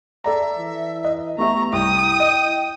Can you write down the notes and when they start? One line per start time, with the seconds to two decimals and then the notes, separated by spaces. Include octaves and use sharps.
0.24 A4 D5 E5 A#5
0.57 E3
1.04 D#5
1.38 A3 B3 G4 E5 A#5 C#6
1.73 C2 E4 G5 D#6
2.20 D#5